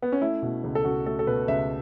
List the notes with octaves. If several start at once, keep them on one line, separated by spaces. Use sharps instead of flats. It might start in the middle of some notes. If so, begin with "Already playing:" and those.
B3
C#4
A3 E4
B2
C#2
A4
C#2 F#4
A3 A4
A4
B2 B4
C#2 E5